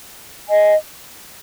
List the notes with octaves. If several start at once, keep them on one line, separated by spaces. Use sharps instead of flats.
D#5 G#5